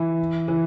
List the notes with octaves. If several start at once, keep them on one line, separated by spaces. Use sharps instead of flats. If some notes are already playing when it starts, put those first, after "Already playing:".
Already playing: E3
E3